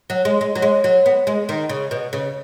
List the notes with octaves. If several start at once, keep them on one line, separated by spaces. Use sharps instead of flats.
F#3
G#3
G#3
F#3
G#3
F#3
B3
G#3
D#3
C#3
B2
C#3